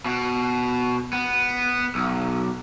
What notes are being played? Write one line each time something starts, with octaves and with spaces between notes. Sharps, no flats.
B2
B3
B1